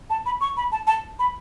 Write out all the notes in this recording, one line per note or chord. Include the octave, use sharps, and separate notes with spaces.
A5
B5
C#6
B5
A5
A5
B5